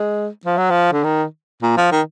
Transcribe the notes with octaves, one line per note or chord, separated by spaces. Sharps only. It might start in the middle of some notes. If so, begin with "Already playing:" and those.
Already playing: G#3
F3
F#3
F3
D3
D#3
A#2
F3
D#3